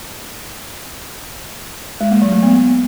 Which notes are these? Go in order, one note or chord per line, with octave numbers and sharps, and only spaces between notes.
G#3
A#3
F#3
A3
B3